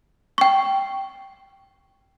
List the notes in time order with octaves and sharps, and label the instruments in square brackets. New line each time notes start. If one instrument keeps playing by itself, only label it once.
[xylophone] G5 C#6